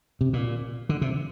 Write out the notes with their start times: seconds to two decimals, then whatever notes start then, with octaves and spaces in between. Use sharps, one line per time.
0.21 C3
0.33 A#2
0.89 D3
1.02 C3